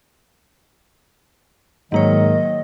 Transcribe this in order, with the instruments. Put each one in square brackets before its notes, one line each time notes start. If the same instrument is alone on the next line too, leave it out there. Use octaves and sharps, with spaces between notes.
[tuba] G#2 [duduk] D#3 [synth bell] F#3 A#3 C#5 [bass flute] D#5